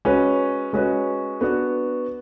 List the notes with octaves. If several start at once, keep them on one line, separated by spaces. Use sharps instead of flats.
G#3 C#4 F#4 B4
G#3 C#4 F#4 B4
B3 D4 F#4